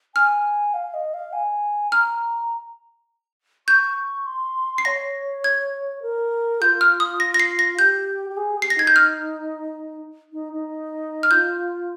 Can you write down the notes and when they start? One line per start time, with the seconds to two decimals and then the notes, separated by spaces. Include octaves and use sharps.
0.15 G#5 F6
0.74 F5
0.94 D#5
1.14 F5
1.33 G#5
1.92 A#5 F6
3.68 C#6 G6
4.26 C6
4.78 C7
4.85 C#5 A#6
5.44 G#6
6.02 A#4
6.61 F4 G6
6.81 F6
7.00 D#6
7.20 A#6
7.34 A#6
7.40 C7
7.59 A#6
7.78 G4 G6
8.29 G4
8.37 G#4
8.57 G4
8.62 C7
8.70 A#6
8.76 D#4 G#6
8.87 G6
8.96 F6
10.33 D#4
10.53 D#4
11.23 F6
11.31 F4 G6